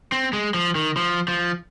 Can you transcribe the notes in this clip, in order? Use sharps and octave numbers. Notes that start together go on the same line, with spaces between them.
C4
G#3
F3
D#3
F3
F3